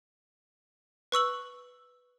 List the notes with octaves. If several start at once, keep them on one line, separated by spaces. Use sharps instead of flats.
B4 C#6 E6 F#7